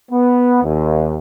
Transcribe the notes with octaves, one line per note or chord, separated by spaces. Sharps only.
B3
D#2